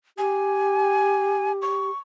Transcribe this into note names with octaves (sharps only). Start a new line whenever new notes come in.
G4 G#5
C#6